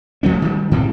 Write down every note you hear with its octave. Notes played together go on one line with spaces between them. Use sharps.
D1 F3 A3 C#4
D#3 G3
G#2 C3 E3 G3